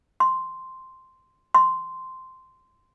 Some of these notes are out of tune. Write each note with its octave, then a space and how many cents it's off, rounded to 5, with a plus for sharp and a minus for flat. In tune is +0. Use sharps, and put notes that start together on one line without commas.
C6 -5
C6 -10